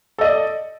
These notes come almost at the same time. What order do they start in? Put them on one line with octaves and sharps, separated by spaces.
A4 D#5 D5